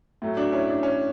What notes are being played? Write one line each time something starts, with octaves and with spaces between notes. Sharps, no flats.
A2 F#3 A3
D4 F#4
C#4 E4
D4
C#4